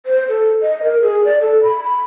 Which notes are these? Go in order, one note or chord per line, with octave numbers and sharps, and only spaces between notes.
C5
A4
D#5
A#4
G#4
D5
A4
B5
B5